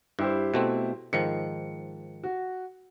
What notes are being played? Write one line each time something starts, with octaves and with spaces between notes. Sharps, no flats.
G2 E4 G4 C5
B2 A3 C4
G#2 D#3 F3 C#7
F#4